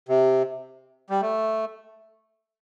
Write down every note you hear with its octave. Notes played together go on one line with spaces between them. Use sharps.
C3
G3
A3